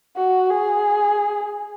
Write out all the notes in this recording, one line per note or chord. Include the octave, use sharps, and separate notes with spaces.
F#4
G#4